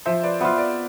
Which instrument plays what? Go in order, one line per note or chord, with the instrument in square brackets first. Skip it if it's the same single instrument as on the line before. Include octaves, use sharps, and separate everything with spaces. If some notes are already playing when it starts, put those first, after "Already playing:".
[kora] F3 [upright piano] C5 E5
[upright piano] B4 D5
[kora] B3 F4 [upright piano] C5 E5
[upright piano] B4 D5